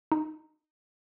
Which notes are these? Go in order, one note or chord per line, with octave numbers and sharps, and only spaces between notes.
D#4